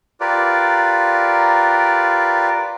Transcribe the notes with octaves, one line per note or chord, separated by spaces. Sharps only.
F4 G4 A#4 B4 D5